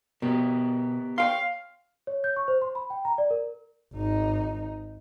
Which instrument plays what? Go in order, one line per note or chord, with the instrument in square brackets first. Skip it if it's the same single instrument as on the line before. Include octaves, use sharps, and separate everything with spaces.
[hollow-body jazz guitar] B2 [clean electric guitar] B3 G4 A#4
[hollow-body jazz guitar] C#5 G5 C6 [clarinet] F5
[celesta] C#5
G6
C#6
C5
C6
B5
G5
A#5
D5
A#4
[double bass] G#1 D#4